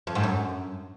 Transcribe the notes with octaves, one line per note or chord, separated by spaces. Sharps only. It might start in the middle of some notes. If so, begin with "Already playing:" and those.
F2
G#2
F#2